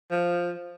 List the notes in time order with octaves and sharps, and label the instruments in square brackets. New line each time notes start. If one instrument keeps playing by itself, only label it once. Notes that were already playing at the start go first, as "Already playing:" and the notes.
[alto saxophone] F3